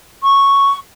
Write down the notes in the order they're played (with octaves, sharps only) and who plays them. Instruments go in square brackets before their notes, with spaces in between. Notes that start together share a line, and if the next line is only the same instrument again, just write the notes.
[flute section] C#6